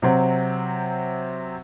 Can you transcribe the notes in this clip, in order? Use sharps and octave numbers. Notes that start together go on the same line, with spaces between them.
C3 F#3 C4